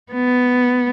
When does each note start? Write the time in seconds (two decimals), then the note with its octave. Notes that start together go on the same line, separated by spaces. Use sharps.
0.12 B3